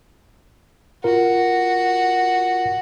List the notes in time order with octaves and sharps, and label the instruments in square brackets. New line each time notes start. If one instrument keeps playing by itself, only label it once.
[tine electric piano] F4 A#4 [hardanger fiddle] F#4